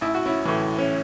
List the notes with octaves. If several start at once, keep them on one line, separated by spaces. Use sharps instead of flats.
A1 E4
F#4
C#4 E4
A2 E3
C#4